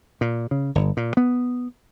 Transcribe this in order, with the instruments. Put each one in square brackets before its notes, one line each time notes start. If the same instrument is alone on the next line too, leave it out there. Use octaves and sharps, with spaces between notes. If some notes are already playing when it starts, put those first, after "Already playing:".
[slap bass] A#2
C#3
G1
A#2
B3